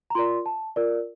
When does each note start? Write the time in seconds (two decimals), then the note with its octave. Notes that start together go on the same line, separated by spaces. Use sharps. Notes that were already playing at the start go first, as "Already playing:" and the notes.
0.10 A#5
0.15 F4 A#4 D5 C6
0.46 A5
0.76 F4 A#4 D5